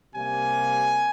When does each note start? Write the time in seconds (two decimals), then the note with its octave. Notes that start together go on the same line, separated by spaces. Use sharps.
0.13 C3 G3 A#3 G#5